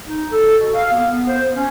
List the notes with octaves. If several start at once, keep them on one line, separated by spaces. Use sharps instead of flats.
D#4
A4
B2
F5
B3
C5
C#4